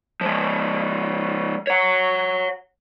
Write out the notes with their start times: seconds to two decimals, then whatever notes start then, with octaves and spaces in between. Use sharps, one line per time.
0.21 F3 G#3
1.67 C#5 F#5